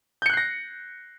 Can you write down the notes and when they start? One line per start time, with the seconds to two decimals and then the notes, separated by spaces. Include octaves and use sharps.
0.22 G6
0.26 C#7
0.30 F#6
0.33 C7
0.37 A#6